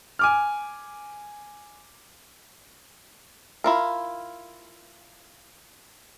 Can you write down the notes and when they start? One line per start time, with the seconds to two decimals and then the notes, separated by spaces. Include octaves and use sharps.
0.19 G#5 D6 F6
3.64 E4 F4 A#4